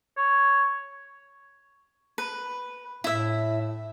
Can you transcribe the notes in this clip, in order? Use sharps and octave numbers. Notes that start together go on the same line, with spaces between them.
C#5
B4
A2 E4 E5